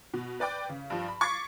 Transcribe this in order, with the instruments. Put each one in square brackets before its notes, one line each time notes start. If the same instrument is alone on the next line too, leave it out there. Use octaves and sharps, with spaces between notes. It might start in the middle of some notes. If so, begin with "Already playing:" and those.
[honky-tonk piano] B2
B4 D5 G5 D6
C#3
G2 F3
B5
C#6 D6 G#6 A6 B6 C7